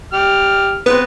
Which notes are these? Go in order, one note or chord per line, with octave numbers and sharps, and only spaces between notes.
G4 F6
B3 C4 B4